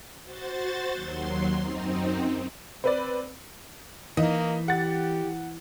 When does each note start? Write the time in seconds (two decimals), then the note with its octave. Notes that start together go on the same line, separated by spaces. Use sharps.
0.24 F#4 C5 A6
0.92 D#2 F#3 C6
1.55 F#2 C4 D#4
2.84 C4 B4 D5
4.17 E3 A#3 D#4
4.68 G4 F#5 A6